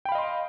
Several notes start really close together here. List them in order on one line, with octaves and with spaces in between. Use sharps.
G5 B5 F5 D#5 C6